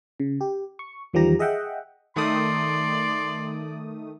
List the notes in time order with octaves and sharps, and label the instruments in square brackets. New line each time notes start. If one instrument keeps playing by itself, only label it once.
[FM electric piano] C#3
G4
C#6
E2 D#3 F3 G3 G4 A#5
G#4 D#5 E5 F#5 G5
[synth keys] D#3 A3 D#6 [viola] D5 [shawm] C6